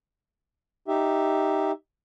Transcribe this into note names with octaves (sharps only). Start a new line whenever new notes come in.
D#4 G4 E5